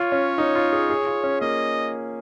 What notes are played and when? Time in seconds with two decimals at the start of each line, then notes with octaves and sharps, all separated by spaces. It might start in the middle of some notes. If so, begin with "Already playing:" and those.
Already playing: F4 C#5
0.12 C#4
0.38 D#4
0.55 F4
0.73 G#4
0.90 G#4
1.06 F4
1.24 C#4
1.41 A#3 D#5